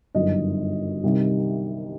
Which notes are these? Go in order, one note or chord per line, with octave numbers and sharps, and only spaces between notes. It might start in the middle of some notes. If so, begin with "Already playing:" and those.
G1 F#2 D#3 D#5
C2 C3 D#3 G3